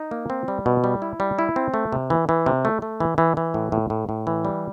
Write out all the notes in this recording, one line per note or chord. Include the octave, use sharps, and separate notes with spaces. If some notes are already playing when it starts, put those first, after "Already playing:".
Already playing: D#4
A#3
C4
G3
B2
G3
E4
G3
E4
C4
A3
C3
E3
E3
C3
A3
A3
E3
E3
E3
A2
A2
A2
A2
E3
G3